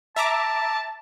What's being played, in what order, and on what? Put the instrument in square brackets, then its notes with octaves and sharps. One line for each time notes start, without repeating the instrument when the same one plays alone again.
[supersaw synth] E5 A#5 D6 [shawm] A5